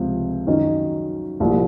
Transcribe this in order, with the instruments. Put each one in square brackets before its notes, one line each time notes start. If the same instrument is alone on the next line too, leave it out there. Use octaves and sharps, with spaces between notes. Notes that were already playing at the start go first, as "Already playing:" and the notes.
Already playing: [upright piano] C#2 C3 F3
F#2 D#3 G#3 C#4
C2 A#2 F3